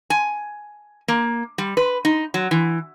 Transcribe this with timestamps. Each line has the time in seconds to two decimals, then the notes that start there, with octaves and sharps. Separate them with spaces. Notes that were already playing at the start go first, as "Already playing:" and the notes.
0.10 G#5
1.08 A#3
1.58 G3
1.77 B4
2.05 D#4
2.34 F#3
2.51 E3